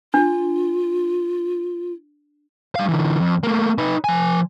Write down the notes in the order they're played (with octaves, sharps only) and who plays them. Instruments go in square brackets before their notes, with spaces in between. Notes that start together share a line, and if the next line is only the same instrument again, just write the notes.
[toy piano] D4 [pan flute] F4
[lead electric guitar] G3 F5
D3 E3
F2
A3 A#3
D#4 B4
F3 G#5